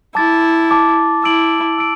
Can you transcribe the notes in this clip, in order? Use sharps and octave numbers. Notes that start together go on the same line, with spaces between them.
E4 A5 D6 A6
A5 D6 A6
E4 E6 D7 F#7
E6 D7